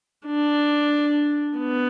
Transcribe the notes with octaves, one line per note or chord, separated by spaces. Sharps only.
D4
B3